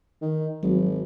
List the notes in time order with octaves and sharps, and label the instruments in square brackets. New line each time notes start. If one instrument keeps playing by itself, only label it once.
[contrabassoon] D#3
[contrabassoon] G#1 [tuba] F#3